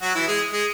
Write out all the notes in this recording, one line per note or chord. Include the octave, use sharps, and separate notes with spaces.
F#3 F#4
E3 E4
G#3 G#4
G#3 G#4